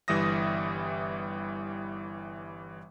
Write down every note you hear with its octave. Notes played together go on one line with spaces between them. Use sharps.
G1 E3 G3 E5 D#6 A#6